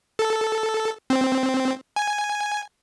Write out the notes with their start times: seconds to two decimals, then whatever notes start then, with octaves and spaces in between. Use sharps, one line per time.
0.19 A4
1.10 C4
1.96 G#5